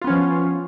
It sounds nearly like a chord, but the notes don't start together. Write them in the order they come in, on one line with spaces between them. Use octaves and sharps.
F4 B3 C#4 F3